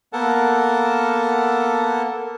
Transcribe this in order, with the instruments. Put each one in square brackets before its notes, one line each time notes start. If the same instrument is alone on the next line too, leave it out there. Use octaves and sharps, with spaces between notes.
[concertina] A#3 B3 A4 A#4 F#5 A5